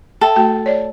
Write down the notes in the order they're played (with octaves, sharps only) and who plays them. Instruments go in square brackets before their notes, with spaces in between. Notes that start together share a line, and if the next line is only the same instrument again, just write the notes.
[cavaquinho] A4 [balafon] E5 G5 A5
[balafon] A3 F#4 G5
C#5 D5